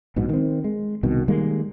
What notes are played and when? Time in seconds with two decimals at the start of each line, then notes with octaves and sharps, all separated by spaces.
0.16 A#1 G#2 B2
0.29 D#3 C4
0.64 G#3
1.03 C2 B2 D#3
1.28 D#3 G3 G#3 A#3